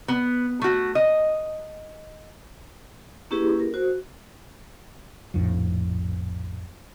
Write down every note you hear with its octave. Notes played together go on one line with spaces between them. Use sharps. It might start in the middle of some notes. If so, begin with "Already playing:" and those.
B3
A3 F#4
D#5
A#3 C#4 E4 G4 G#4 B4
A#4
F#4 C5
F1 A#1 F2 A2